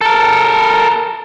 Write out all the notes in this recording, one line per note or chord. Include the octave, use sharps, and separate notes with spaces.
A4 A#4